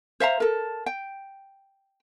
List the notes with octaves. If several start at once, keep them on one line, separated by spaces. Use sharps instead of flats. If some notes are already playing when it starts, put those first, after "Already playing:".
C5 E5 F5 A#5
A4 A#4
G5